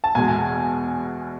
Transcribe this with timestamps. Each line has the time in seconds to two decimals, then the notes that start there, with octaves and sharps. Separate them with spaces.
0.04 A5
0.15 E2 B2 G#3 G#5